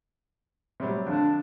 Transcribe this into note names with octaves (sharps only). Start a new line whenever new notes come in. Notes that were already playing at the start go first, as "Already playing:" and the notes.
C3 F#3 G3
F2 D3 D4